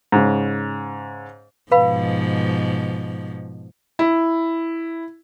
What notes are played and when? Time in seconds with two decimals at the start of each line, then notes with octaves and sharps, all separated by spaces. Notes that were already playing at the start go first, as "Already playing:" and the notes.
0.12 G#2 C#3
1.71 G#2 B2 F3 B4 F5 B5
3.99 E4